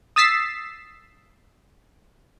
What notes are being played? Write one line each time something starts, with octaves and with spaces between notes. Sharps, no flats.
D#6 E6 A6 B6 C7 E7